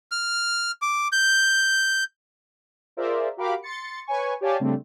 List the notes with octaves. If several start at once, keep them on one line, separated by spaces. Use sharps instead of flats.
F6
D6
G6
F4 G#4 A#4 C5 D5 E5
F#4 G4 A#4 F5 B5 D6
C6 A6 C#7
B4 C#5 G#5 C#6
G4 C#5 D5 F5 G#5 A5
C#3 G3 A3 C4 D4